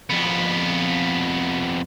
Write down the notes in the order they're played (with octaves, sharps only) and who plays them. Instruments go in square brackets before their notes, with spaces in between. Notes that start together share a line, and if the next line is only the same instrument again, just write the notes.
[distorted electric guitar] F2 B3